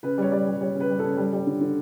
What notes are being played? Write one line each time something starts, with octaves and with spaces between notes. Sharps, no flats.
C#3 B4
G3 C#5
G3 D5
G3
G3 C#5
C#3
B4
G3
C#3 A4
G3
G3
D3
D3